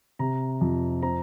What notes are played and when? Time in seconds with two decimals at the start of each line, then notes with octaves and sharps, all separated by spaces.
0.19 C3 A#5
0.61 F2
1.02 C4 A#5